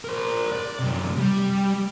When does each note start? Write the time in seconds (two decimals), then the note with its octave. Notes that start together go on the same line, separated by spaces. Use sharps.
0.05 A#4 C5
0.52 D5
0.79 F#2 C3
1.18 G3